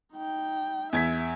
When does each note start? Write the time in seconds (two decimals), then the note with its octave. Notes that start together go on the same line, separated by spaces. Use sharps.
0.14 D#4 G5
0.93 E2 E5 G#6 B6